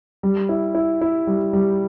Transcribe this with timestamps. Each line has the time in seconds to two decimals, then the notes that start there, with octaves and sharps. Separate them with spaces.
0.23 G3
0.49 E4
0.75 E4
1.01 E4
1.27 G3
1.53 G3